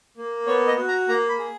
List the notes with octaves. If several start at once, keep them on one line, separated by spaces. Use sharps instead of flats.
A#3
B3 C#5
D#5
F#4
A#5
A#3 A#5
B5
G#4